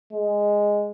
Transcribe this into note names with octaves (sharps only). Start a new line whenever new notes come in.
G#3